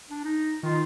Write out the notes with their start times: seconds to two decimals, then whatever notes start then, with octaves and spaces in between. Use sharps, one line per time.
0.10 D4
0.24 D#4
0.63 D#3 F4